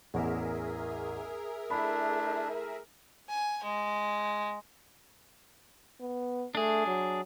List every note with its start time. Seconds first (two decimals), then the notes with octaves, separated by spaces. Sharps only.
0.14 A1 E2 G#4 A#4 E5
1.70 A3 D4 E4 B5
3.28 G#5
3.63 G#3
6.00 B3
6.55 A3 D4 G#4
6.86 F#3